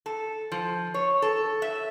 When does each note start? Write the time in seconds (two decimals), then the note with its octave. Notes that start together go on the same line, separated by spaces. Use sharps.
0.06 A4
0.52 F3
0.94 C#5
1.22 A4
1.62 E5